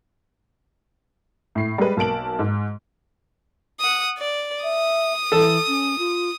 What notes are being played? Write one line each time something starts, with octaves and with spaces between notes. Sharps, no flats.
A2 C7
G3 G#3 B4
B1 A#3 A5 D7 F#7
G#2
F#5 D#6
D5
E5 D#6
E3 A4
C#4
F4